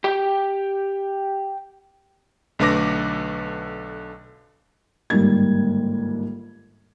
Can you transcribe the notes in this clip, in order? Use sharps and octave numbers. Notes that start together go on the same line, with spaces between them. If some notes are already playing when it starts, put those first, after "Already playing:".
G4 G5
B1 D3 A3 B4 D6 A#6
G1 G#2 D#3 G3 A#3 G#6